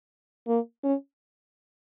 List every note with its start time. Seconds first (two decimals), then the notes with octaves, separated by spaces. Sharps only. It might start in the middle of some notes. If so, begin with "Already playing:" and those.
0.48 A#3
0.84 C#4